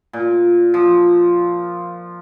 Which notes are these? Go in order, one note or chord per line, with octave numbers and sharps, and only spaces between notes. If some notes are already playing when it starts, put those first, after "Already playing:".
A#2
F3